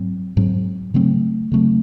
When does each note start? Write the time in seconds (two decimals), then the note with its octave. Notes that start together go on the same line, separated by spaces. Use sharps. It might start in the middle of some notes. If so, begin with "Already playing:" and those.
Already playing: G#2 F#3 C4
0.37 G#2 F#3 C4
0.94 C#3 F#3 A3 C4
1.52 C#3 F#3 A3 C4